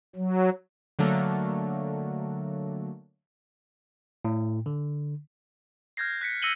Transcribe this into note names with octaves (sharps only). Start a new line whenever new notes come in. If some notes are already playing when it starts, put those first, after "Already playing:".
F#3
D3 F#3 A3 A#3
A2
D3
F6 G6 G#6 A#6 C7
F#6 B6 C#7
E6 A#6 C#7 D#7 F#7 G7